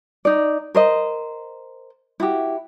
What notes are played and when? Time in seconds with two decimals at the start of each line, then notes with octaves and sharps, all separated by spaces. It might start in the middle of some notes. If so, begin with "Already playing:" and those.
0.25 D#4 D5
0.75 A#4 C5 D#5
2.20 E4 F#4 G4